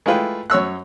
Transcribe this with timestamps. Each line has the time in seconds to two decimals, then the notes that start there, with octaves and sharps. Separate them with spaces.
0.06 G#3 A3 E4 F4 B4 G5
0.50 F#2 C#5 E6 F#6